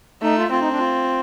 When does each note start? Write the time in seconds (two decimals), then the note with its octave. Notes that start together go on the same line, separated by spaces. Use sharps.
0.22 A3 D#4
0.37 F4
0.51 C4 F4
0.60 D#4
0.71 D4
0.79 F4